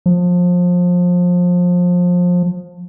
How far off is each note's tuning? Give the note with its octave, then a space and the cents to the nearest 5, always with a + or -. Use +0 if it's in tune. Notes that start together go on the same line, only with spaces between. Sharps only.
F3 +25